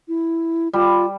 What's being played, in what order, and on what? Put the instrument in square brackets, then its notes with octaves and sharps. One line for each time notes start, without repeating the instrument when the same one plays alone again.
[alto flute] E4
[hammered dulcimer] G3 [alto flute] F4